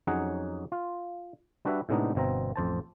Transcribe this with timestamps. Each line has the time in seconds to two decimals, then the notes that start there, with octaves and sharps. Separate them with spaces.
0.07 F2 F#3 C#4 D#4 G#4 F#5
0.72 F4
1.65 G3 D4 F#4 B4 E5
1.89 A2 C3 G#3 B3 D4 D#4
2.15 G1 B2 C4 A#5
2.56 A1 F2 C5 A5